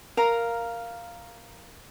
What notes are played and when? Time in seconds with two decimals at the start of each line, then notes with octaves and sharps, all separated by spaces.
0.17 A#4 F5 A#5